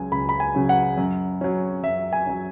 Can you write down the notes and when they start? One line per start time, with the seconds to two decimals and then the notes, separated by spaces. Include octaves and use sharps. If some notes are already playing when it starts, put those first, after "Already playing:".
Already playing: C#2 C#3 F#3 G#5
0.12 C#2 B5
0.29 B5
0.40 G#5
0.55 C#3 F#3
0.69 F#5
0.98 F#2
1.41 F#3 C#4
1.83 F#2 E5
2.13 G#5
2.27 F#3 C#4